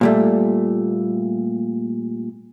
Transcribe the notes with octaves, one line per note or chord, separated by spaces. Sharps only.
A#2 G3 A3